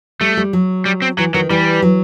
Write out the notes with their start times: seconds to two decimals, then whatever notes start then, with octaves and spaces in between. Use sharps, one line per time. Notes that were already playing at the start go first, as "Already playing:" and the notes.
0.21 G3 A3
0.37 G3
0.53 F#3
0.86 G3
1.02 C4
1.18 E3 F#3
1.34 D#3 F#3
1.50 E3 G3
1.82 F#3